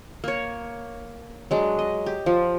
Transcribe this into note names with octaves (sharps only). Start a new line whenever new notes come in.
A#3 C#5
F#3 G#3 D4
D#5
G4
F3